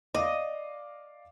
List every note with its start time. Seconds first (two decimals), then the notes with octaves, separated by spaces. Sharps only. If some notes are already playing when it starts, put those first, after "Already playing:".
0.15 D5 D#5 F5 D6